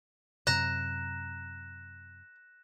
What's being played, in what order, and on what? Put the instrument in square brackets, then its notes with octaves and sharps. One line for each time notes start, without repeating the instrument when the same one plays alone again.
[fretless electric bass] F#2 C3 [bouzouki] A#5 [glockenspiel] F#6 A#6 E7